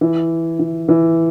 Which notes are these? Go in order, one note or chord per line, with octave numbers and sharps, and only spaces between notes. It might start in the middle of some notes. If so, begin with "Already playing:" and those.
E3
E3
E3